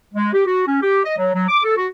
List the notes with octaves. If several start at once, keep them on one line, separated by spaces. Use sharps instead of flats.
G#3
G4
F#4
C#4
G4
D#5
F#3
F#3
D6
A4
F#4